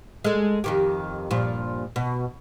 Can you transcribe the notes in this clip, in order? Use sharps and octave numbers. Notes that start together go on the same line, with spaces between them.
G#3 A4
F2 D#3 G4
G2 A#2 F3
B2